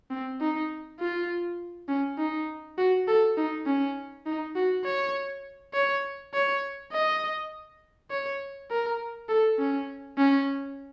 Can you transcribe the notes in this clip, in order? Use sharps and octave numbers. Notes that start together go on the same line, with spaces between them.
C4
D#4
F4
C#4
D#4
F#4
A4
D#4
C#4
D#4
F#4
C#5
C#5
C#5
D#5
C#5
A#4
A4
C#4
C#4